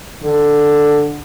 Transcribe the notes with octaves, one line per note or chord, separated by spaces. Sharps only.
D3